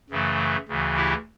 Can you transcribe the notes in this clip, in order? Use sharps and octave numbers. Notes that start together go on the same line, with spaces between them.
F#2 C#3 E3 A3
D2 C#3 E3
E4 G4